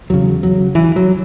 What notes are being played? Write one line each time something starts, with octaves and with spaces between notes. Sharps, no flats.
E2 C#3 F#3
F#3
E3
F#3